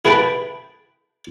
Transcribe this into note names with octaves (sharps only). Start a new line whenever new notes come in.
E4 G#4 B4 G5 A5 B5